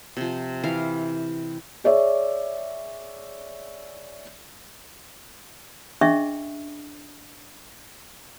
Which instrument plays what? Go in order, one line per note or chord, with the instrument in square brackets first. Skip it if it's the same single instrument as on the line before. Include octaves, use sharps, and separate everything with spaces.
[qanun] C3 F3
E3 F5
[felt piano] G#4 C#5 D5 E5
[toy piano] C#4 D4 G#4 D#5 E5 C#6